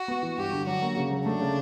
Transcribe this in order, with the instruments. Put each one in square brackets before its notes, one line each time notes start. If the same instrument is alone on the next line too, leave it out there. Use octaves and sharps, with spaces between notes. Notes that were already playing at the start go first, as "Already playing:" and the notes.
Already playing: [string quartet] F#4
[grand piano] B3
E3
[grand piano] G2 [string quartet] G4
[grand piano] D3
[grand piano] F#3 [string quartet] F#4
[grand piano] A#3
C#3
F#3
[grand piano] A3 [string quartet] D4
[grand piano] C#3